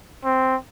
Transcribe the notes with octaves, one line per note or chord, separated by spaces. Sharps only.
C4